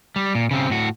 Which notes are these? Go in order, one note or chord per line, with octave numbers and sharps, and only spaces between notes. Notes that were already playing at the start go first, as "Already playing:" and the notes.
G3
A#2
C#3 C4
A2 F#4